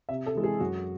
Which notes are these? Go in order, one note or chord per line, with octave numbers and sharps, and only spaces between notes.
C3 E5
A4
E3 G#3
G#4
F#2 F#4